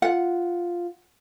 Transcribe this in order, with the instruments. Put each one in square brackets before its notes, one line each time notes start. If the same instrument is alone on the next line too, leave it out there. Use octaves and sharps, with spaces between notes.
[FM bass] F4 [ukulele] F#5